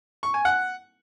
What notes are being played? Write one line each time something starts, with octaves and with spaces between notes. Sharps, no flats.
C#6
G#5
F#5